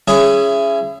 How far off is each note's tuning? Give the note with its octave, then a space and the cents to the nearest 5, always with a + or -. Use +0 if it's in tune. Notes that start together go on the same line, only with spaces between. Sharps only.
C#4 +0 E4 +30 G#4 +0